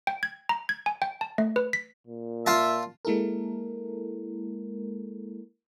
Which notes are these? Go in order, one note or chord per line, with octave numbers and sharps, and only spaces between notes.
G5
G#6
A#5
G#6
G#5
G5
A5
A3
B4
B6
A#2
F4 E5 A5
G#3 A#3 E4 A4 A#4